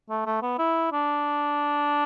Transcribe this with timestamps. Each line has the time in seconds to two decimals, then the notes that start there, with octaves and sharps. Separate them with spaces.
0.10 A3
0.26 A3
0.42 B3
0.59 E4
0.92 D4